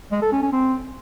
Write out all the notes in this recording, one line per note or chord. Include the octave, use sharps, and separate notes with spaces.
G#3
A4
C#4
C#4
C4